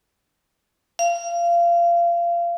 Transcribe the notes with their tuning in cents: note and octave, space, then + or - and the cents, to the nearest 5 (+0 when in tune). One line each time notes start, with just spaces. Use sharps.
F5 -25